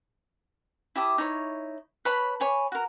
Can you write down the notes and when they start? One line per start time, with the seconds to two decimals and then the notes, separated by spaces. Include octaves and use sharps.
0.96 E4 G4 A5 D#6
1.18 D#4 E4 C#5
2.05 B4 C#5 A5 B5
2.40 C#5 G#5 B5
2.72 F#4 A#4